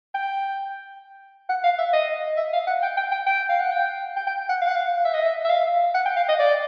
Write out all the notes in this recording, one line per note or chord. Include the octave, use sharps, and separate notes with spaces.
G5
F#5
F5
E5
D#5
E5
F5
F#5
G5
G5
G5
G5
F5
F#5
G5
G5
G5
F#5
F5
F#5
F5
E5
D#5
E5
E5
F5
F#5
G5
F5
D#5
D5